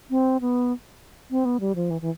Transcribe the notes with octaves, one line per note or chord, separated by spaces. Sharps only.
C4
B3
C4
B3
G3
F3
E3
E3